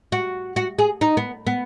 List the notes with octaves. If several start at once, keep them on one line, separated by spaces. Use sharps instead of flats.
F#4
F#4
G#4
D#4
B3
B3